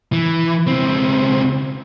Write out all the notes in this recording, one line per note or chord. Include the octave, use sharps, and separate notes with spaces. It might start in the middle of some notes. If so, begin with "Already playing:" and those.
E3
C#2 C4